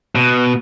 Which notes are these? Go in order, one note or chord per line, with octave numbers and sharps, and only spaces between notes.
B2